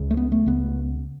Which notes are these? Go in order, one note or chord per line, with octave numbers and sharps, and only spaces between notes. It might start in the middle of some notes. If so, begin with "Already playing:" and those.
Already playing: C#2 C#3
A3
B3
A3
C#2 C#3 B3